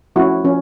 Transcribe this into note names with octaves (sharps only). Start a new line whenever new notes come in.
F3 A3 C#4 E4 F#4
F3 C#4